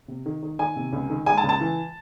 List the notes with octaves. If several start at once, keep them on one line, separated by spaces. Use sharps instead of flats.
C3
D#3
D#3
D#3 G#5
C3
C#2
D#3
G#3 G#5
A5
C#2
A5
E3